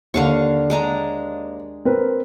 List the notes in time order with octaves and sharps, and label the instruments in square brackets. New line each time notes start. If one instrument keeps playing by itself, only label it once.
[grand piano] D#2 [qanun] D3 F5 C#6
[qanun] G#3 D4 A#5
[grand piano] C4 A#4 B4